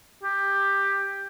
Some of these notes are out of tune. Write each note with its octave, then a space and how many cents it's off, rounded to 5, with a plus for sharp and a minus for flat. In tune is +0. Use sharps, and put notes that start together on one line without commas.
G4 +10